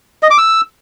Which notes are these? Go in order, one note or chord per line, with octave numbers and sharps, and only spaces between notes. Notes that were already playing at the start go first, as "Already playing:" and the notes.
D#5
D6
E6